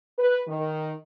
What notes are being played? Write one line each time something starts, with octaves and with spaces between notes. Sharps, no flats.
B4
D#3